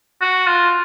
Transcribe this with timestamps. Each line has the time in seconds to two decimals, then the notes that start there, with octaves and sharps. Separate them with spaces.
0.21 F#4
0.47 F4